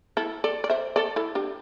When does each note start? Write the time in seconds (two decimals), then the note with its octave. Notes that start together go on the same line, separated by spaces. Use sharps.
0.17 E4 A4
0.44 A4 D5
0.64 D5
0.70 C5 E5
0.96 A4 D5
1.16 E4 A4
1.35 D4 G4